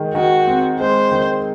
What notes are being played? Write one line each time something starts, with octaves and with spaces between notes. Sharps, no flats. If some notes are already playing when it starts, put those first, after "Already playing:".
Already playing: D#3 G#3
D#3 F#4
C4
G#3 C5
D#3